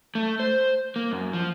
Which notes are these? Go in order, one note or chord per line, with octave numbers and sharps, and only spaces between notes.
A3
C5
A#3
F#2
F3